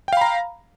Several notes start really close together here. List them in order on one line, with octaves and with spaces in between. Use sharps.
G5 F5 B5 A#5